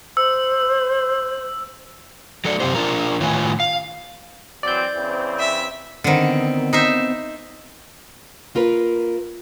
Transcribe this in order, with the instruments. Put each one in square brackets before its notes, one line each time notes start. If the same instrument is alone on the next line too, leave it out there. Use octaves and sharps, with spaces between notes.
[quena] C5 [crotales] E6
[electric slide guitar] F#3 A4 D5
F#2 C3 F3 C#4 G4 C5
D4 F4 A#4
A2 D#3 F4 B4 C#5 G#5
F5
[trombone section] E3 F#3 C4 [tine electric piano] D5 G6
[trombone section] C#3 E3 C4
[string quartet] E5
[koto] D3 D#3 [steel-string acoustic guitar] B3 C4
[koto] D#4 C5 E5
[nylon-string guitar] A#3 F4 A#4 B4